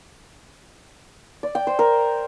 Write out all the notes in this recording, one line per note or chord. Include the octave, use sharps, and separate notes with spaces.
D5
G5
C5
A#4